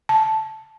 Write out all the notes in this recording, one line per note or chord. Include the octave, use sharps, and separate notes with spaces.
A5